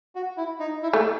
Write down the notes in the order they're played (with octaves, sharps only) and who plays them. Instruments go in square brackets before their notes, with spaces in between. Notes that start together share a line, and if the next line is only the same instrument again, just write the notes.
[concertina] F#4
E4
D#4
E4
[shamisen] A3